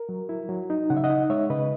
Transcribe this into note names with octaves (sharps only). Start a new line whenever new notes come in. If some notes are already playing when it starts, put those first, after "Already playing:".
Already playing: A#4
F#3
E4
F#3
D#4
C#3 F#5
E5
D#5 F#5
D#4
G#3 C#5 E5
C#3 B4 D#5